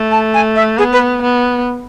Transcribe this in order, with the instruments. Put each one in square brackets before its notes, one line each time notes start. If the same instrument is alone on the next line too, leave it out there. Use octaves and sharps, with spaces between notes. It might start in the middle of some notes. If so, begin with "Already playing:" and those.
Already playing: [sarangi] A3
[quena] A5
G#5
E5
[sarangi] B3 [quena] G#4
[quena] B4
[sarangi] B3